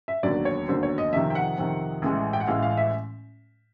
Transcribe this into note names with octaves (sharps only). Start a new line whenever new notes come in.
E5
E1 D#2 D3 F#3 D5
C#5
E1 D#2 D3 F#3 C5
C#5
D#5
F2 C3 D#3 E5
G5
F#5
F2 C3 D#3
A1 A2 E3 G#3
G5
F#5
A1 A2 E3 G#3 F5
F5
E5